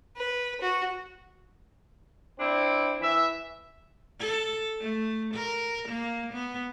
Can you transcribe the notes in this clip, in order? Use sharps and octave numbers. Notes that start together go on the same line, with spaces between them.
B4
F#4
C4 D4 E4
E3 E5
A4
A3
A#4
A#3
B3